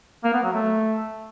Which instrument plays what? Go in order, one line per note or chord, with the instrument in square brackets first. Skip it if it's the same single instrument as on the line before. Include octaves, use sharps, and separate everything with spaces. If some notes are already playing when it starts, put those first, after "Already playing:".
[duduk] A#3
B3
F#3
A3